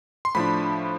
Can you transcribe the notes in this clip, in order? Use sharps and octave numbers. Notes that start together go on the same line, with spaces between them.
C6
A2 F3 A3 D4 B5